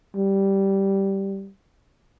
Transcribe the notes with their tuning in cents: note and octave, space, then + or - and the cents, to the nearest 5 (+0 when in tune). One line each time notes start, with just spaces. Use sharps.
G3 -5